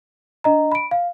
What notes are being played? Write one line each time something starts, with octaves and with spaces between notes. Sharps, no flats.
D4 D#5 A#5
B5 D7
F5